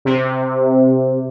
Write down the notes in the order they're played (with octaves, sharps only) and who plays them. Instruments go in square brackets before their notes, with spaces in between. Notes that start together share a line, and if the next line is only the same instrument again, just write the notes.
[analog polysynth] C3